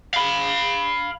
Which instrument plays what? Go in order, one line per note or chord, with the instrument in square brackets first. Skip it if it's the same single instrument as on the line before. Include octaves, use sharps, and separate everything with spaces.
[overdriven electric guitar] F5 B5